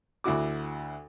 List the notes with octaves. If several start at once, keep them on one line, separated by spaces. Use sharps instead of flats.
D2 E4 F#4 D6